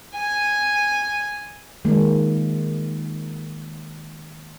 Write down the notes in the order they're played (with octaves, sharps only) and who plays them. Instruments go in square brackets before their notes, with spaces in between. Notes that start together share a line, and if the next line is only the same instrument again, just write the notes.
[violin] G#5
[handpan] D#3 G#3 A#3